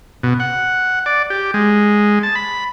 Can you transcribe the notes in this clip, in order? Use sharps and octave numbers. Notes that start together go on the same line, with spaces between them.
B2
F#5
D5
G4
G#3
A5
B5